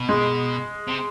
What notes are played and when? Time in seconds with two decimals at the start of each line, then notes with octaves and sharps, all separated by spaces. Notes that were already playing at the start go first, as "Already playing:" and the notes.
Already playing: B2
0.09 G#3
0.88 C3